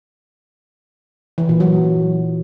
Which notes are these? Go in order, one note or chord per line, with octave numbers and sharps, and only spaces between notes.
E3
A#2
F#3